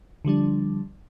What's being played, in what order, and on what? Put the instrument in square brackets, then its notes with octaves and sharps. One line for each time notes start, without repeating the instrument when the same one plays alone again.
[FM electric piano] D3 F3 G3 D4